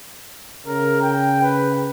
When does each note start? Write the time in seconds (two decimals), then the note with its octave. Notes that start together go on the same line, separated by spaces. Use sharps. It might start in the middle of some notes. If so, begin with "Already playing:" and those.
0.67 C#3 A#4
1.02 G5
1.43 B4